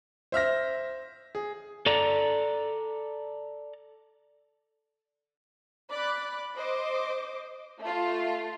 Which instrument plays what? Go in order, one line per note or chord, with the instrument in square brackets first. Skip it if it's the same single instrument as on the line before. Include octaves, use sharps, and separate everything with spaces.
[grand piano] C5 E5 F6 A#6
G#4
[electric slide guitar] A4 D5 A#5
[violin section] D5 B5 D6 F#6
C5 D#5 D6
A3 F4